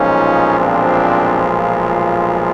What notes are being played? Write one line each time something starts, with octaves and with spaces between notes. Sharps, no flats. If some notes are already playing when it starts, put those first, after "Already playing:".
Already playing: B1 A#2 F3 G#3 C#4 D#4
C4 D4